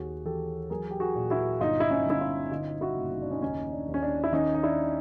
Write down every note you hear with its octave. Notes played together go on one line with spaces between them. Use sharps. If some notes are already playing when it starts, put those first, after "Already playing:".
Already playing: D#2 F#4 G#4
E3 G4 A4
F#3 G#4 A#4
G4
F#4 G#4
A#2
E4 F#4
G1 D#4 F4
E4
C#4 D#4
G1 E4
D#4 F4
D3 D#4 F4
E4 F#4
F#1
D#4
D4
C#4 D#4
D#2 C#4 D#4
D4
D#2
C#4
D4
E4
D#3 C#4 D#4
D#4
D4 E4